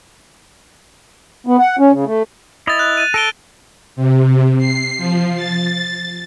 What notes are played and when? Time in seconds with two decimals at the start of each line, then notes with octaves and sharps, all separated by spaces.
1.47 B3
1.59 F#5
1.79 C#4
1.92 C#3
2.06 A3
2.67 E4 D#5 A6 F7
2.79 F#6
2.97 A6 D#7
3.14 A4 A#6 D7 G7
3.96 C3
4.58 C7
4.98 F3
5.36 A6